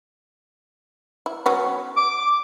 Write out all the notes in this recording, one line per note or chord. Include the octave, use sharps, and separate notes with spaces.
E4
F#3 B3 C#4
D6